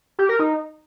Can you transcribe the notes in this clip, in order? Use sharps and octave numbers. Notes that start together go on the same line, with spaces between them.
G4
A#4
D#4